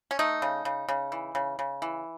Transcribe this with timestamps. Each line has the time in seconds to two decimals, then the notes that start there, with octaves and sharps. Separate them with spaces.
0.11 C#4
0.19 A3 D#4
0.42 C#3
0.65 C#3
0.89 C#3
1.12 E3
1.35 C#3
1.59 C#3
1.82 E3